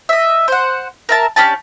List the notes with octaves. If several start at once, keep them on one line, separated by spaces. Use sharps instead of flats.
D#5 E5
C5 F#5
A#4 E5 A5
C#4 D4 G4 A5